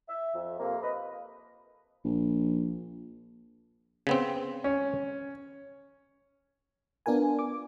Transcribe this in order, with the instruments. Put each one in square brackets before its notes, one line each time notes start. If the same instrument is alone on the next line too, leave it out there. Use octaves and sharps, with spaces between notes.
[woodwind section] E5
F2
F2 C3 A#3
B4 D#5
[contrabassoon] A#1
[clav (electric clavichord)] C#3 B3 C4
[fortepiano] C#4
[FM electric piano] B3 D4 F4 A#4 G#5
D6